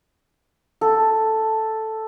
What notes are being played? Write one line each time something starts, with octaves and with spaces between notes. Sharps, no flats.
A4